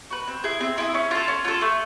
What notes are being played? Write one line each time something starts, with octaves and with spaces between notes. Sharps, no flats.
F#4 B4
C4
E4 G#4
C4
E4 G#4
C#4
F4 A4
C#4
F4 A4
A3